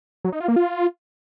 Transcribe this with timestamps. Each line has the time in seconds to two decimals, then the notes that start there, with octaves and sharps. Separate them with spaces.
0.25 F#3
0.32 D#4
0.40 F4
0.48 A#3
0.56 F4